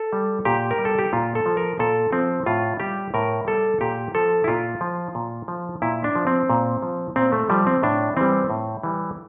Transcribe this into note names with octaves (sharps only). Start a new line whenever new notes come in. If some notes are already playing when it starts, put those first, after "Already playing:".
Already playing: A4
G3
A#2 G4
A#4
G3
A4
G4
A#2 F4
A4
F3
A#4
A#2 A4
F3 C4
A2 F4
G3 G4
A2 A#4
G3 A4
A#2 G4
F3 A4
E4
A#2 F4
F3
A#2
F3
A#2 E4
D4
F3
C4
A#2
F3
A#2 C4
A3
F3 G3
C4
A2 D4
E3 G3 C4
A2
E3 G3